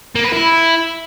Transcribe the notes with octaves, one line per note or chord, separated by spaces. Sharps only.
A#3
B4
E4